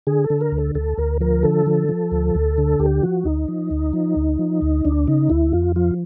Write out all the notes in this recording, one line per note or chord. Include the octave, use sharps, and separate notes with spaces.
D3 G#4
A4
D3
A#4
D2
A4
D2 A4
D2 A#4
F3 A#4
D3 A4
F3
F3
D2
D2
D3
D2 G4
F3 F#4
D2 D#4
F3
D2
F3
D2
F3
D2
D2 D4
C#3 D#4
D2 E4
F2 F4
F3 F4